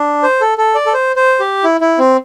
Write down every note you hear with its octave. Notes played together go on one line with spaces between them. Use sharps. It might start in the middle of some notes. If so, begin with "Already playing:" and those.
Already playing: D4
C5
A4
A4
D5
A4
C5
C5
G4
E4
E4
C4